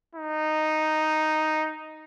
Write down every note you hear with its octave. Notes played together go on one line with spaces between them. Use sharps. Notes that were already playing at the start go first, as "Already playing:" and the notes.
D#4